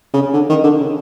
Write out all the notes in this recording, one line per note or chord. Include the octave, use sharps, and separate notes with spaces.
C#3
D3
D#3
D3
C#3